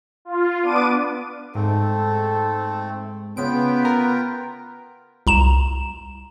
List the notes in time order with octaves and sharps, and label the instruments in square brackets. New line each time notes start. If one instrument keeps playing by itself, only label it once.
[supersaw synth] F4
B3 D4 D6 D#7
[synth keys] G#2 [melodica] A3 C4 [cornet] A4
[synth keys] C#3 D7 [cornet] B3 [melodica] F4 B4 G5
[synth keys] A#4
[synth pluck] C2 A#5 E7